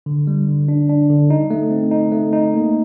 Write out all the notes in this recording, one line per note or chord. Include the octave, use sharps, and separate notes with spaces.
D3
G3
D3
D4
D4
D3
D#4
A3
C4
D#4
A3
D#4
A#3